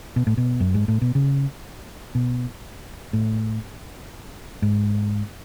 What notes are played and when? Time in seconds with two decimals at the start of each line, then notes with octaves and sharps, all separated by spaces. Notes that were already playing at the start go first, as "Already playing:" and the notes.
0.16 B2
0.27 A2
0.37 B2
0.60 F#2
0.74 G#2
0.88 A2
1.02 B2
1.15 C#3
2.15 B2
3.13 A2
4.62 G#2